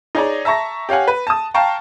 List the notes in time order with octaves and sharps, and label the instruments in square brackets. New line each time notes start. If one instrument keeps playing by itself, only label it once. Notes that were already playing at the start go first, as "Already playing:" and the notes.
[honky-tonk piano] D#4 G#4 C#5 D5 A#5
E5 A5 A#5 C#6 A#6
G4 C#5 F5 F#5 G#5
B4
A5 D#6
F5 G5 A5 A#5 C#6